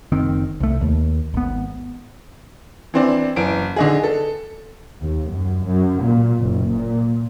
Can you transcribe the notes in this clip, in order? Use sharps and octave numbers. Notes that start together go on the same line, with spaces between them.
F#1 D#3 C4
C2 A3
D#2
G#1 B3
E3 C4 D4
F#1 E3 D7
D3 D#4 G#4
A4
D#2
F#2
F#2
A#2
F#1
A#2